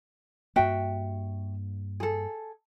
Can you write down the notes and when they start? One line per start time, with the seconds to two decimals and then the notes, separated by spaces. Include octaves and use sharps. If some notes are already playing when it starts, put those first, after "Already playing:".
0.56 G2 A#3 F#4 E5 G5
2.00 G#4 A4